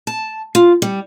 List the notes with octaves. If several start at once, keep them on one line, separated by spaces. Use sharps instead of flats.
A5
F4
G3